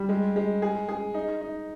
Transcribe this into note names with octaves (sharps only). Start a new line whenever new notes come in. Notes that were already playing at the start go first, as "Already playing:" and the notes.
Already playing: G3
G#3
G#3
G#4
G#4
D#4
D#4